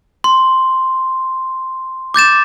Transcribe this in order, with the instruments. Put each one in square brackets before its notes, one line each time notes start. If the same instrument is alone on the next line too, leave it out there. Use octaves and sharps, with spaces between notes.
[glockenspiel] C6
D6 G6 A6 E7